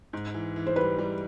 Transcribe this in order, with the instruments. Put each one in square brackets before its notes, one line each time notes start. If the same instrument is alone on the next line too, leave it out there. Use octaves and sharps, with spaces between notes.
[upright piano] G#2
E3
E3
[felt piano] C5
[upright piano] G3 [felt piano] B4
[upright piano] G3